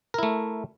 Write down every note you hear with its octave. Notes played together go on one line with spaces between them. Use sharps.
A3 E4 A#4